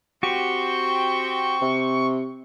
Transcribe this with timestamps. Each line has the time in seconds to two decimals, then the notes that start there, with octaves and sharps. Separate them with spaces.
0.23 C4 F#4 G4 G5 C#6
1.61 C3